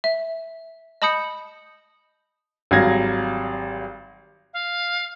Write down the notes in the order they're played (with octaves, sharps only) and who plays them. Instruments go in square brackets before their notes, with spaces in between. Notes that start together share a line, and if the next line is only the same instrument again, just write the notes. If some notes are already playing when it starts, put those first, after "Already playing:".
[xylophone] E5
D#5 A5 B5 D#6 G6 C#7
[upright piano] G#1 F#3 G3 F5 G#6 A#6
[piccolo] F5